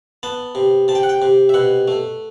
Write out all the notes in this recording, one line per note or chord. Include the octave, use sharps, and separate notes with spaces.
B3 A5
C3
C3 A5
G5
F#5
G5
C3
E5
B2 F#5
A3